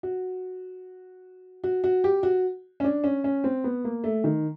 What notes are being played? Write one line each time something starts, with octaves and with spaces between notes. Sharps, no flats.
F#4
F#4
F#4
G4
F#4
C#4
D4
C#4
C#4
C4
B3
A#3
A3
D#3